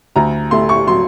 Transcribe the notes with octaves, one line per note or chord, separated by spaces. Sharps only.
D2 A#5
A3 C6
C#6
F#3 C6